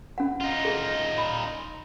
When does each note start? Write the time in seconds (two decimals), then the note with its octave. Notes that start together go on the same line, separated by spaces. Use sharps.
0.18 C#4 F#5
0.40 D#4 F4
0.65 G#4
1.18 B5